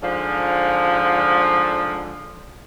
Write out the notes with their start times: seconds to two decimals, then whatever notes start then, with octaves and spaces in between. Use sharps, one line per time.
0.02 G#2 D3 F3